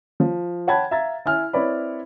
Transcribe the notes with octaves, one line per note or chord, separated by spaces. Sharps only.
F3
C#5 F#5 G5 A5 B5 G#6
E5 F5 A#5 G#6 A6
E4 G#5 F6
C4 E4 B4 C#5 D5 B5